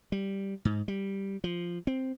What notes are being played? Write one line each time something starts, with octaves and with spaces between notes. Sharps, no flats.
G3
G#2
G3
F3
C4